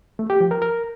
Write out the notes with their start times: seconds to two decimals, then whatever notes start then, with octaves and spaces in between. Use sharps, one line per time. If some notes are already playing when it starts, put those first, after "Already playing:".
0.19 A3
0.30 G4
0.40 F3
0.51 A#4
0.62 A#4